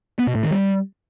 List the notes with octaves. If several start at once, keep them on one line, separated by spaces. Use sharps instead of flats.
B3
B2
A2
D#3
G3